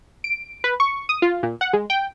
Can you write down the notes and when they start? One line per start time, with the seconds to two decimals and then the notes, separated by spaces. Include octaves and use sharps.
0.24 D7
0.64 B4
0.80 C#6
1.09 D#6
1.22 F4
1.43 A#2
1.61 F#5
1.73 G#3
1.90 G5